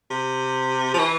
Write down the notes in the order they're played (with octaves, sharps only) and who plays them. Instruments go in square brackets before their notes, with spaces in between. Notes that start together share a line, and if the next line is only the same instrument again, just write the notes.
[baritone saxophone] C3
F3
E3